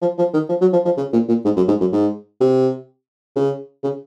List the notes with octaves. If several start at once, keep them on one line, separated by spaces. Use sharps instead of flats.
F3
F3
D#3
F3
F#3
F3
F3
C#3
A#2
A#2
G#2
F#2
G#2
F#2
G#2
C3
C#3
C#3